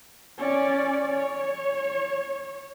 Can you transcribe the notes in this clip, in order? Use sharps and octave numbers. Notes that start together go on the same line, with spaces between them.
C#4 D5
C#5